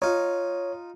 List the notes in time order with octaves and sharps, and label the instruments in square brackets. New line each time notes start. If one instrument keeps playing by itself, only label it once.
[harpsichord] D#4 F4 [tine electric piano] C#5